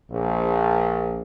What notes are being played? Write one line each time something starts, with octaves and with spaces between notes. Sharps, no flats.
A#1